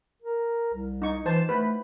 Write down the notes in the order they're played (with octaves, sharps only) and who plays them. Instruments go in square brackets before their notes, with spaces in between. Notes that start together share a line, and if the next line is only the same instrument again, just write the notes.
[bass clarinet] A#4
C2
[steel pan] D#4 C#6
[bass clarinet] E3 [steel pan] C5 A5
[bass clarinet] A3 [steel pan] B4